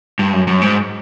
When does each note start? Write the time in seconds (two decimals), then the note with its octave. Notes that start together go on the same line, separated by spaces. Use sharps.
0.19 G2
0.33 F#2
0.47 F#2
0.62 G#2